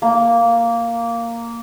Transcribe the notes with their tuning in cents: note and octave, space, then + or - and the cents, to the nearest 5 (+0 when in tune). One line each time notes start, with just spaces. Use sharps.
A#3 -5